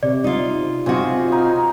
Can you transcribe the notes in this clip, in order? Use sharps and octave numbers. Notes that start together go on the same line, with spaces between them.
C3 D5
D#4 F4
C3 F4 F#4 G#4 C5 D#5
D#4 D#5